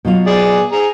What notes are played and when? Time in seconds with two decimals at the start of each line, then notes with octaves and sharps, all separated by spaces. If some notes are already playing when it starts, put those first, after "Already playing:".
0.05 B2 F#3 F4
0.27 G#4 D5
0.72 G#4 A#5